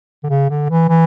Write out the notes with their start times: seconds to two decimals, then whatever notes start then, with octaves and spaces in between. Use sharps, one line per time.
0.24 D3
0.30 C#3
0.50 D3
0.69 E3
0.89 E3